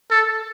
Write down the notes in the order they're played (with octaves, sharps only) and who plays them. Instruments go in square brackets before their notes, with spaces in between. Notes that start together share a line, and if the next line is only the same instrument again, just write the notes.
[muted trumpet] A4